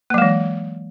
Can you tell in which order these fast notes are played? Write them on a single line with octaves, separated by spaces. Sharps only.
A#3 F#3 G#3 E3